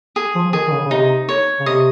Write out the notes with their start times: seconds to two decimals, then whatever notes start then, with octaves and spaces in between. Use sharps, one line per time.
0.16 G#4
0.35 F3
0.53 D#3 G#4
0.68 D#3
0.72 C#3
0.85 C#3
0.91 C3 D#4
1.29 C#5
1.59 C#3
1.66 C3 D#5